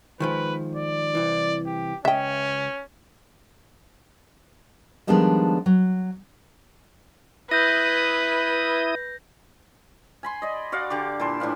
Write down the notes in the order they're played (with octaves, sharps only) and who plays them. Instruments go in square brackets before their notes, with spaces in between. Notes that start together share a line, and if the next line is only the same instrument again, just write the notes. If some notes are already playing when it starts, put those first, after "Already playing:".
[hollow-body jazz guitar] D#3 F3 G#3 [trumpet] B4
[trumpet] D5
[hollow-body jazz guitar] C2 E3
[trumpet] G4
[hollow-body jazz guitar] C#2 D#5 [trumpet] C#4 [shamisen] E5 G5
[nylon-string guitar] D#3 F3 G3 G#3 B3 D4
F#3
[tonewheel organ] E4 D#6 [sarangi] B4 [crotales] G6 A#6
[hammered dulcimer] G#5 B5 C6
D5 D#5
F#4 D5 F5 F#5
D3 G4 D6
A#2 E4 A5 C6
A2 E3 D4 F4